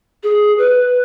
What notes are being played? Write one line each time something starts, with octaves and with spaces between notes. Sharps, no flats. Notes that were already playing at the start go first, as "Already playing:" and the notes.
G#4
B4